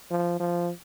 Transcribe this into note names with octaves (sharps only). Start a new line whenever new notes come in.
F3
F3